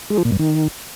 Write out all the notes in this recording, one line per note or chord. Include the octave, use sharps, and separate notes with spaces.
G#3
F3
A#2
G2
D#3